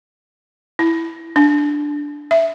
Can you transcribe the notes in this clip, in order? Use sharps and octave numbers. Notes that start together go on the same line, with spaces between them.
E4
D4
E5